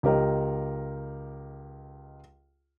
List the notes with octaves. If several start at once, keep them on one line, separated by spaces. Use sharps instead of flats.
C#2 G4 A#4 D#5